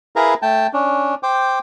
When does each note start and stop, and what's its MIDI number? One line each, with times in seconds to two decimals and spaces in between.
0.16 0.34 64
0.16 0.34 68
0.16 0.34 70
0.16 0.34 71
0.16 0.34 77
0.16 0.34 82
0.42 0.67 57
0.42 0.67 79
0.42 0.67 81
0.73 1.15 61
0.73 1.15 62
1.23 1.59 72
1.23 1.59 79
1.23 1.59 86